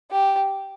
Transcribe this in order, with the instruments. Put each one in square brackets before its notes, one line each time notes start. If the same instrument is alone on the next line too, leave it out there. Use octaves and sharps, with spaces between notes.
[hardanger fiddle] G4